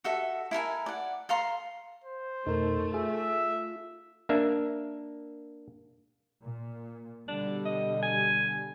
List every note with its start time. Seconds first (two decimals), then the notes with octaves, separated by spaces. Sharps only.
0.04 F#4 A4 E5
0.51 E4 A4 A#4 G#5
0.86 D5 F#5
1.29 A4 F5 A#5 C6
2.04 C5
2.47 F2 B2 A3 D#4 A#4
2.94 F4 G#4 E5
4.29 A#3 D4 E5
6.42 A#2
7.28 B2 D3 G3 D4
7.65 D#5
8.03 G#5